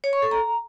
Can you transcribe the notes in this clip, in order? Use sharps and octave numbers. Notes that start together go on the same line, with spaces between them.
C#5
C#6
A4
A#5